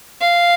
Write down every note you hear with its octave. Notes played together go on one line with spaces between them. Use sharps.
F5